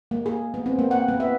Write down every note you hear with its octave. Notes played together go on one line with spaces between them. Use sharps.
A#3
G#4
B3
C4
A#3
F#5
B3
E5